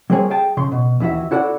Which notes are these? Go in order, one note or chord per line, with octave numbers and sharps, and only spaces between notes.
G3 A#3 C4 F#4 G#4 C#5
G#4 G5 A5
C#3 C6
B2
D#2 E3 E4 F#4 E5
E4 F#4 A4 D5 F#5